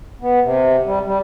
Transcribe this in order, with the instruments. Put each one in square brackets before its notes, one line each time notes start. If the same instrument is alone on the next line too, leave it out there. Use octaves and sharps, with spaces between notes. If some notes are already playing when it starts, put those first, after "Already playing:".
[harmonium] B3
C3
G3
G3